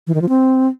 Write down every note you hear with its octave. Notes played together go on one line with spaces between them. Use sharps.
E3
D#3
F3
C4